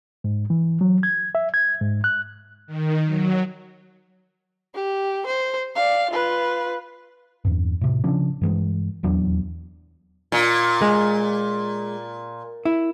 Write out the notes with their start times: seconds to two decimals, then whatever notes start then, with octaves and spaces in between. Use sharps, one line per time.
0.24 G#2
0.50 E3
0.81 F#3
1.03 G#6
1.35 E5
1.54 G#6
1.81 G#2
2.04 F#6
2.67 D#3
3.05 F#3
4.75 G4
5.26 C5
5.76 D5 F5
6.11 F4 B4
7.45 E2 G2
7.81 A2 C3
8.04 C#3 F3 C#4 D4
8.41 G2 E3 G#3
9.03 D#1 E2 F#3 D4
10.32 A#2
10.82 G#3
12.65 E4